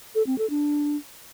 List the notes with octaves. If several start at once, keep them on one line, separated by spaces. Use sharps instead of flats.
A4
C4
A4
D4